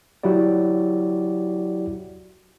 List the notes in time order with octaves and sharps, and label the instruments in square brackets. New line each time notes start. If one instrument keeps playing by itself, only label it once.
[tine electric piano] F#3 E4 F#4 G4 D5